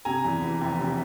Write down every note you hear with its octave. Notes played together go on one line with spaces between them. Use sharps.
C3 G#5 A#5
E2
E3
F1
C3